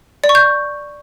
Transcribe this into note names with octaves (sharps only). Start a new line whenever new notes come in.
D5
C#6
G6